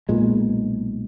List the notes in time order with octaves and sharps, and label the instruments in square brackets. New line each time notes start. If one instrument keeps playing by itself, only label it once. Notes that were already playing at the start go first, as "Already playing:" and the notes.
[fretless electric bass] B1 A#2 G#3